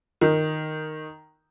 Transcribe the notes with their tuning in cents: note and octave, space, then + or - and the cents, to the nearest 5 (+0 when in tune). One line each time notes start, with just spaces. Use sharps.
D#3 -10